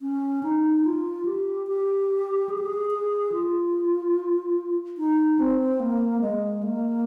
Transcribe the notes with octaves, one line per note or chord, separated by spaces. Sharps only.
C#4
D#4
F4
G4
G4
G#4
G4
G#4
G#4
F4
D#4
C4
A#3
G#3
A#3